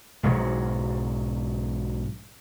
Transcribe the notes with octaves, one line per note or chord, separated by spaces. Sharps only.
B1 G#2 F#3